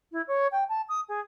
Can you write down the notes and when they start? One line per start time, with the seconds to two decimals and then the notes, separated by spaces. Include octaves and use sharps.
0.12 E4
0.27 C#5
0.52 G5
0.68 A5
0.88 D#6
1.08 G#4